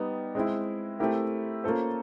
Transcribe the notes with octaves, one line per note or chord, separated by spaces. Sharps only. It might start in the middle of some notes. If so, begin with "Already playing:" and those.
Already playing: G3 B3 D#4
G#3 C4 E4
A3 C4 E4 G4 A#4
A#3 C#4 F4 A4 C5